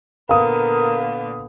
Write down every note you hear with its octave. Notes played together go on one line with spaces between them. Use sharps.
A#2 D3 B3 A#4 F5 D#6